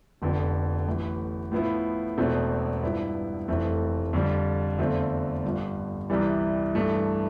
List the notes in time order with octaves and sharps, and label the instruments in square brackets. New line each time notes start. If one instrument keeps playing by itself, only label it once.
[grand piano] F1 F2 D3 F3 B3
A1 A2 E3 B3
A2 F3 B3 E4
E1 E2 B2 A3 C4
G2 F3 B3 E4
F1 F2 E3 A3 C4
F2 D3 G3
E2 D3 A3 C4 F4
G1 G2 F3
C2 C3 E3 G3
G2 E3 A3